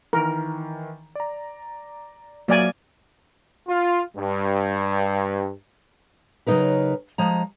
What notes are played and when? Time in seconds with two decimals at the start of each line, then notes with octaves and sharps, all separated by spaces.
0.13 D#3 E3 A#4
1.15 D5 A#5
2.48 F#3 A#3 D5 E5 G#5
3.69 F4
4.17 G2
6.47 C#3 F#3 G3 D#4 A#4 B4
7.18 F3 G#3 A#5